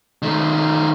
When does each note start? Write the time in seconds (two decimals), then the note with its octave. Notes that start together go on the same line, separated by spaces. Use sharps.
0.22 D#3 A3